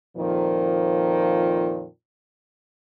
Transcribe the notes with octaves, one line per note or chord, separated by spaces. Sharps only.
F2 A#2 D#3 F3